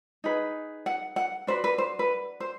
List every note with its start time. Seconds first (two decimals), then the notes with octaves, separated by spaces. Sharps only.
0.24 D#4 G#4 B4
0.86 F#5
1.16 F#5
1.47 D4 F#4 B4 C5
1.64 B4
1.78 C5
1.99 B4
2.40 C5